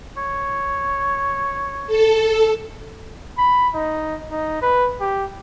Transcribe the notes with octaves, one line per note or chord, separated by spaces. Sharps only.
C#5
A4
B5
D#4
D#4
B4
G4